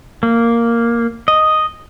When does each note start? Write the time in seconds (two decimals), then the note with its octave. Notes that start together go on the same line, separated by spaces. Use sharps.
0.23 A#3
1.28 D#5